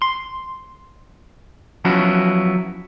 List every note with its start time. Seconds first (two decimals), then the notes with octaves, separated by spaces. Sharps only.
0.02 C6
1.85 F3 F#3 B3 C#4 E4 F#4